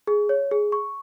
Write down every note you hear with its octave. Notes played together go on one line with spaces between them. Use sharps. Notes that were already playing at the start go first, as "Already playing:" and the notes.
G#4
C#5
G#4
C#6